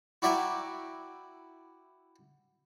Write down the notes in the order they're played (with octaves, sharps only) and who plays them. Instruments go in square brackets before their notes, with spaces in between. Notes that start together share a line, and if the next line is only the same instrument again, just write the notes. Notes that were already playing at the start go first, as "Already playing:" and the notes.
[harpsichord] E4 F#4 D5 E5 G5 A#5